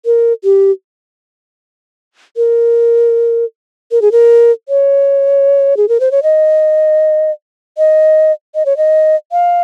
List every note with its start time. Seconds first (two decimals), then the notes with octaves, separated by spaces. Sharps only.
0.06 A#4
0.44 G4
2.37 A#4
3.91 A#4
4.02 G#4
4.12 A#4
4.69 C#5
5.77 G#4
5.89 A#4
6.00 C5
6.11 C#5
6.23 D#5
7.78 D#5
8.55 D#5
8.66 C#5
8.77 D#5
9.32 F5